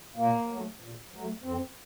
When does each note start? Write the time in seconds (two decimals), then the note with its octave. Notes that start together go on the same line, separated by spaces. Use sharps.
0.16 A#2 A#3
0.48 F#3 A3
0.80 A#2
1.12 F#3 A3
1.43 F2 C4